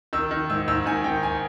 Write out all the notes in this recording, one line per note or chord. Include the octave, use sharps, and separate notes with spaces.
D#3 E6
D#3
G#2 E6
G#2 E6
D#3 G#5
D#3 G5
G#5